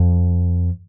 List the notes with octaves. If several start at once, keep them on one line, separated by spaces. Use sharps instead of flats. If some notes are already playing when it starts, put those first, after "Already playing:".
Already playing: F2